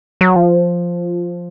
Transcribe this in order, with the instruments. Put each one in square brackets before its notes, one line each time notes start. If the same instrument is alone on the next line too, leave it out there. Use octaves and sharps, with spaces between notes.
[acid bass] F#3
F3